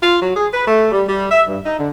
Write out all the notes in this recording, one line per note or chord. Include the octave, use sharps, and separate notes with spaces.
F4
F#3
G#4
B4
A3
G3
G3
E5
G2
D#4
D3